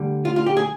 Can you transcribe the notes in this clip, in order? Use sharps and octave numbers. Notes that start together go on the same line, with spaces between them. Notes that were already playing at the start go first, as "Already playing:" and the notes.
Already playing: D2 D3 G3
F4
F4
G4
G#4